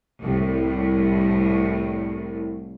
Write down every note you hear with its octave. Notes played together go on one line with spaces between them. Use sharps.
C2 A2